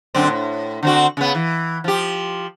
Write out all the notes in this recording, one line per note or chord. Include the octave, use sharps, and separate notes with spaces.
F#2 D3 C4
A2
D3 C4 F#4
C#3 B3
E3
F3 G4